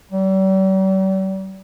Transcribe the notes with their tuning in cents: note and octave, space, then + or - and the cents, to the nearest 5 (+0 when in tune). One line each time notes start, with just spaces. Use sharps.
G3 -40